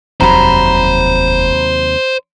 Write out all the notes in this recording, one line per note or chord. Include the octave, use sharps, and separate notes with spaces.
F1 D#2 C3 F#3 C5 A#5 B5